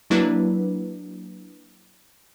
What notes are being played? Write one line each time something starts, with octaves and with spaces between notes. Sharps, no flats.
F#3 A#3 D4 E4 F#4 B4